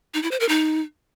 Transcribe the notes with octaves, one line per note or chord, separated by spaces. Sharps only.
D#4
E4
C5
A#4
D#4